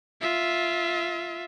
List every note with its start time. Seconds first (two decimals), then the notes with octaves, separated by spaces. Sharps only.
0.21 F4 E5